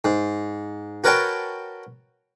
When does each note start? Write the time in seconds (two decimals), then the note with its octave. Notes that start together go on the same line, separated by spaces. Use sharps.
0.04 G#2
1.04 F#4 A#4 B4 C#5 G5 A5